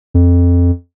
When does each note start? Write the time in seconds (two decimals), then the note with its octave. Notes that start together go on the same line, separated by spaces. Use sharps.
0.14 F2